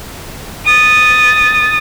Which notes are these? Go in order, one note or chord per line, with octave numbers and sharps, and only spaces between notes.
D#6 A6